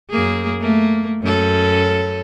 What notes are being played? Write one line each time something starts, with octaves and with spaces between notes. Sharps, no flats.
F#2 A#3 G#4
A3 A#3
F#2 C#4 A4